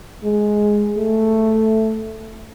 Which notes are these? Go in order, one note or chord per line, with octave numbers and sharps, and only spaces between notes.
G#3
A3